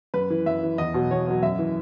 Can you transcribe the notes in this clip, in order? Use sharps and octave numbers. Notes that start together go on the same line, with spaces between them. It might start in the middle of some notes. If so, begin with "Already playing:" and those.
F#2 B4
E3
F#2 E5
E3
E2 D#5
B2 F#3
E2 C#5
B2 F#3
F#2 E5
E3